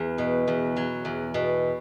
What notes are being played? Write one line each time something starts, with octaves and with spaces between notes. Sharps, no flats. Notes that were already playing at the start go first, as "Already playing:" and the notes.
Already playing: E2
B2
E2
F#3
E2
B2